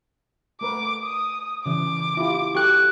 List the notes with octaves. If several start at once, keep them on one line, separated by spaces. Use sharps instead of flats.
A3 A#4 B4 D6
D#6
C#3 E3 D6
E4 F4 G4
F#4 G4 A4 C#6 F#6